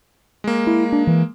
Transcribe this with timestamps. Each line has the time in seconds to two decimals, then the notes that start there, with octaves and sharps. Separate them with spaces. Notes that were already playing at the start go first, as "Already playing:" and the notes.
0.44 G#3 A#3
0.67 E4
0.93 D4
1.07 E3